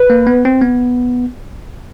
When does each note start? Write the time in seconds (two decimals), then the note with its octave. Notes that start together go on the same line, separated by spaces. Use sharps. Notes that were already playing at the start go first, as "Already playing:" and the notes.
Already playing: B4
0.10 A#3
0.27 B3
0.45 C4
0.62 B3